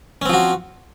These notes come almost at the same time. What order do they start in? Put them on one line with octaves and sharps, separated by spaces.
C#4 C4 F3 F#4